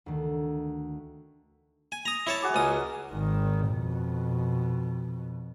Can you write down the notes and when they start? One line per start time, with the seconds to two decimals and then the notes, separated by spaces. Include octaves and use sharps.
0.06 D2 D#3
1.92 G#5
2.05 A#5 D#6
2.27 E4 C#5 A5
2.42 F#4 G#4 D6
2.54 C#2 A#3 C#4 G#5 D#6
3.12 G#1 D#3
3.71 F2 B2